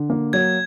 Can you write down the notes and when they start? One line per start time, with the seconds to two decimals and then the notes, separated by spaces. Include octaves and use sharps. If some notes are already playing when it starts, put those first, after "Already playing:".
Already playing: D3
0.10 A#3
0.33 F#3 G#6